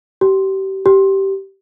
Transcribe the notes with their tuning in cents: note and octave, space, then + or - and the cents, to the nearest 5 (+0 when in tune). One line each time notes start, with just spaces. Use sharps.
G4 -30
G4 -15